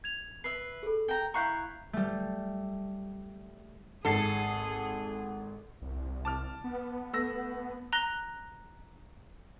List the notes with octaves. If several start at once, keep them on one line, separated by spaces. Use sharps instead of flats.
G#6 F7
B4 E5 C7
G#4 A4
G5 A#5
E4 F5 A#5 C#6 F#6 G6
G3 A3
G#1 G#4 A4 C7
C2
A5 D6 F6
B3
A3 E6 A#6
A#5 F#6 A#6 G7